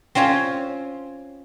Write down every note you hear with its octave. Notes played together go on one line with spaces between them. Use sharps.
C4 C#4 F4 C#5